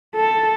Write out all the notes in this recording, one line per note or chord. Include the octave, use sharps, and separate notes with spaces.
A4